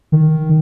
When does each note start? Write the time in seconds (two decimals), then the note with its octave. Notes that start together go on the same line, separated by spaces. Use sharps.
0.12 D#3